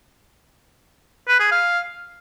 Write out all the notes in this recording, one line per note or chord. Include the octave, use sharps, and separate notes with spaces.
B4
G#4
F5